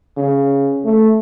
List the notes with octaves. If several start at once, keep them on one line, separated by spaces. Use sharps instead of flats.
C#3
A3